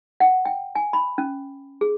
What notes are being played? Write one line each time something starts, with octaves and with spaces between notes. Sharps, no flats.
F#5
G5
G#5
B5
C#4
G#4